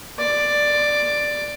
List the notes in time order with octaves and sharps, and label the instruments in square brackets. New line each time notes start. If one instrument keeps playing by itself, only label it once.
[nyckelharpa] D5